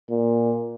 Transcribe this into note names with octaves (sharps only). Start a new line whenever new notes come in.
A#2